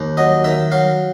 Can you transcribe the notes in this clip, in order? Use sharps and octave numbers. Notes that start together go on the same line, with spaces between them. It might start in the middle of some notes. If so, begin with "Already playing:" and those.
Already playing: D#2
F#3 D#5
D#3 E5
F#3 F5